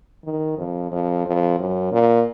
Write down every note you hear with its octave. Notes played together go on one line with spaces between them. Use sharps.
D#3
F2
F2
F2
F#2
A#2